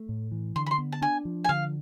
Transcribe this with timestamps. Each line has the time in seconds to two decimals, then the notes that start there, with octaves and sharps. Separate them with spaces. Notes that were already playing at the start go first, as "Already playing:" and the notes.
Already playing: A3
0.09 A2
0.31 E3
0.56 D3 C6
0.66 B5
0.71 C6
0.78 B3
0.92 A5
1.02 D4 G#5
1.25 F3
1.44 G#5
1.49 D3 F5